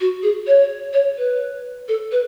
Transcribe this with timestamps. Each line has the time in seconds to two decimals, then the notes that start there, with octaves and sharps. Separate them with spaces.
0.01 F#4
0.23 G#4
0.47 C#5
0.93 C#5
1.18 B4
1.88 A4
2.12 B4